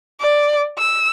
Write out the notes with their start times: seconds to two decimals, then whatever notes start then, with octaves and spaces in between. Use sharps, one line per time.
0.20 D5
0.78 E6